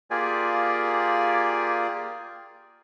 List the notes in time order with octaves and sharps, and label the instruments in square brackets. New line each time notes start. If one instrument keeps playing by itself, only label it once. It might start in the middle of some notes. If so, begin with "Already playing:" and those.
[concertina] A#3 F4 G4 G#4 D5 G#5